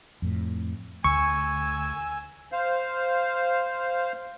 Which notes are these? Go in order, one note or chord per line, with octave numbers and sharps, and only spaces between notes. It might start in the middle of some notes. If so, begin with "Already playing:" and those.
F2 A2
D2 G#5 C#6 E6
C5 F5